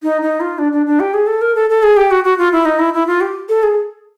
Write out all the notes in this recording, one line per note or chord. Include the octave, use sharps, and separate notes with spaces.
D#4
D#4
F4
D4
D4
D4
G4
G#4
A4
A#4
A4
A4
G#4
G4
F#4
F#4
F4
E4
D#4
E4
E4
F4
G4
A4
G#4